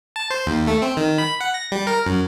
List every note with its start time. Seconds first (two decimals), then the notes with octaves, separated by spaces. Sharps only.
0.16 A5
0.30 C5
0.46 D#2
0.67 A3
0.82 C4
0.97 D#3
1.18 B5
1.41 F#5
1.54 A#6
1.72 G3
1.87 A#4
2.06 F#2